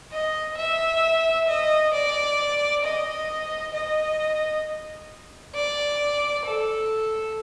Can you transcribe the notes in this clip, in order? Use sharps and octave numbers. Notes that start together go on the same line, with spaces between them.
D#5
E5
D#5
D5
D#5
D#5
D5
A4